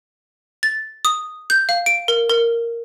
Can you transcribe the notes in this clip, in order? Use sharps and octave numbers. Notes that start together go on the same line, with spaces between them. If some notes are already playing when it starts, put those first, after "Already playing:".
A6
D#6
G6
F5
D7
A#4
A#4